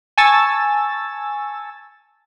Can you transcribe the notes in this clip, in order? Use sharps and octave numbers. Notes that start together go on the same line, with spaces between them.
G#5 A5 C#6 E6 A6